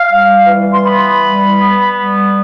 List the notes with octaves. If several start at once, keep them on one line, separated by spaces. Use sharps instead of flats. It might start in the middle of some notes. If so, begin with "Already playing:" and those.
Already playing: F5
G3
E3
C6
B3 B5
G3
B3
G3